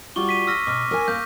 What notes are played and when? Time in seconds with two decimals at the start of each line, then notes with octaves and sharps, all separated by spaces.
0.16 G3 F4 F#4 C#6 D6 G7
0.29 B6 D#7
0.47 E6 F6 A#6
0.67 B2 D6 F6
0.91 A#4 G#5
1.08 A#3 G6